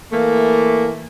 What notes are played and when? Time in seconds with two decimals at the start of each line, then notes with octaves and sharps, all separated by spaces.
0.12 E3 A3 A#3